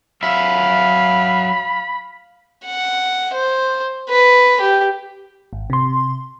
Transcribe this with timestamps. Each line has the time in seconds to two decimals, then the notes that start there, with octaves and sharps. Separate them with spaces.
0.23 F#3 E5 F5 B5
2.65 F#5
3.34 C5
4.09 B4
4.61 G4
5.53 G#1
5.70 C3 C6